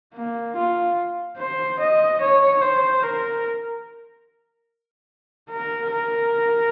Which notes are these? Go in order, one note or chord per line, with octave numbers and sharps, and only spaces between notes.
A#3
F4
C5
D#5
C#5
C5
A#4
A#4
A#4